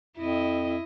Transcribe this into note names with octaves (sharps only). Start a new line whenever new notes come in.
F2 E4 D#5